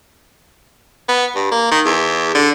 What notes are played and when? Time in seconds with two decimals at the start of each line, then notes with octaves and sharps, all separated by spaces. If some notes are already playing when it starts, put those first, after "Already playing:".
1.09 B3
1.35 G2
1.52 A#3
1.72 D#3
1.85 E2
2.35 D3